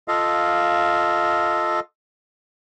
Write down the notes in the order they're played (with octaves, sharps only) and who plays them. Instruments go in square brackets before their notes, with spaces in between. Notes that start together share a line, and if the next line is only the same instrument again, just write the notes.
[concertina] F4 A4 D#5 F5